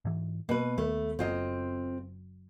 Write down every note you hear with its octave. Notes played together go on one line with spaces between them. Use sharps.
G#2 E3
B2 A#3 B4
D#2 A3
F#1 F#2 F#3 C4 F4 D#5